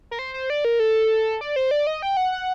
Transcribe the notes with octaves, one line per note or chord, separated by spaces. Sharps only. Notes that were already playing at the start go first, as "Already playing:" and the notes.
A#4
C5
C5
D5
A#4
A4
D5
C5
D5
D#5
G5
F#5
F#5